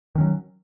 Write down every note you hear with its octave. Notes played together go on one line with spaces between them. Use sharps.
D#3 F#3 C#4